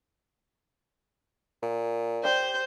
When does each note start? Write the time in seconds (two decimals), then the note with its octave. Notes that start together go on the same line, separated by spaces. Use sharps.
1.62 A#2
2.24 G4 C5 D5 G6